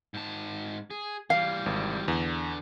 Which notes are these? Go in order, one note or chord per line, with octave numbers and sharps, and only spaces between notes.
G#2 A5
G#4
E3 G3 F5
G#1
E2 D3